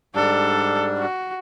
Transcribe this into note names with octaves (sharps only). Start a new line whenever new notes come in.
G#2 G3 D4 A4
F#4